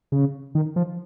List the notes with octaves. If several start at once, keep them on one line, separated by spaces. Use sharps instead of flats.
C#3
D#3
F3